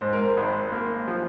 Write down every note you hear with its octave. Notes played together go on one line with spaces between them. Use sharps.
G#2 C5
A#4
C5
G#1
A#3
F3